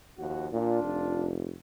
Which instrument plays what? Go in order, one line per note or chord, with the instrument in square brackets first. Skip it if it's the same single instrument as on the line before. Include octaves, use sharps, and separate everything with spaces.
[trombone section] D#2 F3 F#4
[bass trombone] A#2 [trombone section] D4 F4
[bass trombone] F1